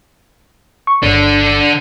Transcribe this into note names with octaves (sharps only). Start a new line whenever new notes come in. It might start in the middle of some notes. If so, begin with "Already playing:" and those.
C#6
G1 D3 D4